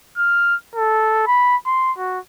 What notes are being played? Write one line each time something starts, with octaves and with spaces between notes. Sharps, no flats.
F6
A4
B5
C6
F#4